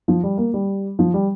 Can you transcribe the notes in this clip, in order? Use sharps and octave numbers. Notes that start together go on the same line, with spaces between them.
F3
G3
A#3
G3
F3
G3